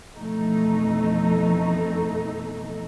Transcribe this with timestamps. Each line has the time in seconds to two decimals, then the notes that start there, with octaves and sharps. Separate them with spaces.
0.15 F2 B2 E3 A3 D#4